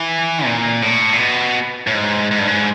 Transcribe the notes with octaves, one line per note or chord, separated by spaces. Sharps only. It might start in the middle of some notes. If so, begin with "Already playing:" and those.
Already playing: E3
A#2
A2
A#2
B2
A2
G#2
G#2
G2
G#2